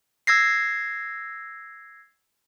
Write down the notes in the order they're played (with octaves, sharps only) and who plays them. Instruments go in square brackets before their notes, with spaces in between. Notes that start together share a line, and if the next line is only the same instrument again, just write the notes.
[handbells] E6 G#6 A#6 C7